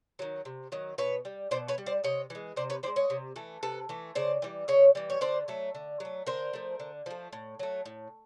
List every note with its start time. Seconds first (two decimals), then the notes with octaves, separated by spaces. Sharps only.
0.19 D#3 F#3
0.45 C3
0.72 D#3 F#3
0.98 B2 B4 C#5
1.25 G3
1.51 B2 C5 D5
1.68 B4 C#5
1.78 G3
1.86 C5 D5
2.04 C3 C#5 D#5
2.30 E3 G#3
2.56 C3 C5 D5
2.70 B4 C#5
2.83 E3 G#3 C5 D5
2.96 C#5 D#5
3.10 C3
3.36 E3 A3
3.63 C3 A4 B4
3.89 E3 A3
4.15 C#3 C5 D5
4.42 E3 G3
4.68 C#3 C#5 D#5
4.95 E3 G3
5.10 C#5
5.21 D3 C5 D5
5.48 F#3 A3
5.75 D3
6.00 F#3 A3
6.27 D3 A#4 C5
6.53 F3 A3
6.80 D3
7.06 F3 A3
7.33 A2
7.59 F#3 A3
7.86 A2